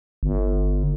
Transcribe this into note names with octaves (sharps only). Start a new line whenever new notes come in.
G1